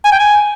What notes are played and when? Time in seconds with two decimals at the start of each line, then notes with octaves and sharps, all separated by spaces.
0.05 G#5
0.12 G5
0.20 G#5